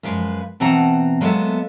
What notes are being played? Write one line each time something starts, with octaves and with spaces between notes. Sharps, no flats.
F#2 F3 G#3 B4
B2 E3 C4 F#5 A5 A#5
F#3 G#3 A#3 B3 A4 E5